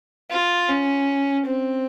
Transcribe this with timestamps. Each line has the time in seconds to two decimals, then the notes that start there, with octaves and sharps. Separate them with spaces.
0.31 F4
0.69 C#4
1.46 C4